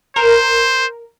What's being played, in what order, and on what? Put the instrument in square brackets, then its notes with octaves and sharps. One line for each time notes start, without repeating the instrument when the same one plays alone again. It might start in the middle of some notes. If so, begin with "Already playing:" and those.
[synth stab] A#4 [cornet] C5